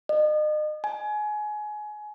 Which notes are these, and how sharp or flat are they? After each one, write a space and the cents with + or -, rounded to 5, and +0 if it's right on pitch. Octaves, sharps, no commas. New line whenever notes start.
D#5 -35
G#5 +25